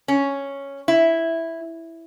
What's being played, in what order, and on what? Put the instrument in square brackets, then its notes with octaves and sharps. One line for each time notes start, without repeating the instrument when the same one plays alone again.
[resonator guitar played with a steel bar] C#4
E4